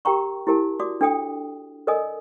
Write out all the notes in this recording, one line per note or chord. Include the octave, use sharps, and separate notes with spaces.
G4 A#4 G5 A#5 C#6
E4 G4 A#4 A5
F#4 D5 D6 D#6
D4 A4 G5 D#6
A4 A#4 D5 D#5 G#5 D#6